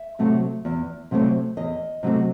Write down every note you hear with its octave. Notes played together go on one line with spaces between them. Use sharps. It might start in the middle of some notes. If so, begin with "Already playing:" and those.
Already playing: E5
C3 F#3 A3 C4
E2
C3 F#3 A3 C4
E2 D#5
C3 F#3 A3 C4